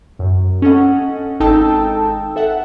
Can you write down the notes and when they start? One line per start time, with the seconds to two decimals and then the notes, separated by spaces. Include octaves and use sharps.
0.19 F#2
0.62 C#4 A4 D#5 F#5
1.40 G#1 D#4 A4 G5 A5 E6
2.36 A4 E5 F#5